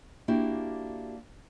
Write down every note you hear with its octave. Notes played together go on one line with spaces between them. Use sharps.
A#3 D4 E4 F#4 G4